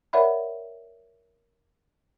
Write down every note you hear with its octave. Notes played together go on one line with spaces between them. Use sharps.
A#4 C#5 D5 E5 F#5 B5